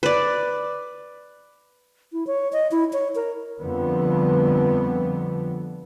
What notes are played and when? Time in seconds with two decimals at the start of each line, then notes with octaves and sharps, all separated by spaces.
0.03 B4 D5
2.13 E4
2.27 C#5
2.53 D#5
2.71 E4
2.93 C#5
3.15 A#4
3.61 F2 D3 G3 B3